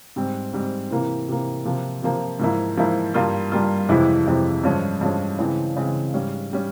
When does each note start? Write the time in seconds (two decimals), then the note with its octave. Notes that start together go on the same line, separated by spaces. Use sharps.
0.16 G#2 G3 C4
0.53 G#2 G3 C4
0.91 C3 E3 A#3
1.28 C3 E3 A#3
1.65 C3 F3 A#3
2.02 C3 F3 A#3
2.39 G#2 F3 A#3 E4
2.77 G#2 F3 A#3 E4
3.14 G2 G3 A#3 F4
3.52 G2 G3 A#3 F4
3.89 F2 C3 E3 G#3 E4
4.27 F2 C3 E3 G#3 E4
4.64 G2 F3 G#3 C#4
5.01 G2 F3 G#3 C#4
5.39 C#3 E3 G#3 C4
5.76 C#3 E3 G#3 C4
6.14 G#2 G3 C#4
6.53 G3 C#4